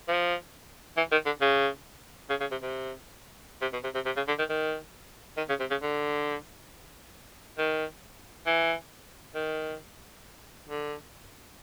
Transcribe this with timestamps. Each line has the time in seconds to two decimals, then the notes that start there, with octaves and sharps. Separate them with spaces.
0.08 F3
0.97 E3
1.11 D#3
1.26 D3
1.41 C#3
2.29 C#3
2.40 C#3
2.51 C3
2.62 C3
3.61 C3
3.73 B2
3.83 C3
3.94 C3
4.05 C3
4.16 C#3
4.28 D3
4.39 D#3
4.49 D#3
5.37 D#3
5.49 C#3
5.60 C3
5.70 C#3
5.82 D3
7.58 D#3
8.46 E3
9.35 D#3
10.67 D3